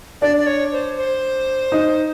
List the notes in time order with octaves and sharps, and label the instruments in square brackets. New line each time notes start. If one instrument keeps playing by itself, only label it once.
[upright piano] D4 [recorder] D5
[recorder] D5
C#5
C5
C5
[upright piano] D#4